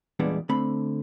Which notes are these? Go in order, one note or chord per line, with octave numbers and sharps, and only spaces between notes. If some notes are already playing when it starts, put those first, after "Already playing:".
E2 A#2 G3 G#3 B3 D4
D3 A3 C4 B5